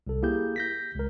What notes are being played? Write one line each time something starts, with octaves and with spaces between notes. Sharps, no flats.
C2 A4
A#3 E4 G4 G#4 G6
G6 A#6 B6
C#2 A#4